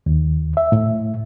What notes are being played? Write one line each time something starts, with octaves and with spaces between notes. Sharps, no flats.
D#2
E5
A2